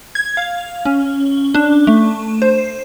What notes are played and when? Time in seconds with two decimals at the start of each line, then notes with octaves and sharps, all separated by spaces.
0.15 G#6
0.37 F5
0.85 C#4
1.54 D4
1.87 A3
2.42 C5